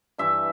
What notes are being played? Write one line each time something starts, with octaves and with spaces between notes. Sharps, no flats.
G2 E3 E5